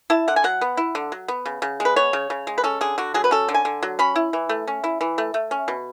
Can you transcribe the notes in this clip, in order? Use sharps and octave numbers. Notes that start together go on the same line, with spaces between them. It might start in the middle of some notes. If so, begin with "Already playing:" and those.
E4 A5
D3 F#5
G#5
F#3 F#5
B3
E4
D3
F#3
B3
C#3
C#3
G#3
B4
B3 C#5
C#3
C#3
G#3
B4
C#4 A4
D3 G#4
D3 F#4
F#3 G#4
B4
C#4 A4
D3
G#5
D3
F#3
C#4 B5
E4
E3
A3
C#4
E4
E3
A3
A3
C#4
B2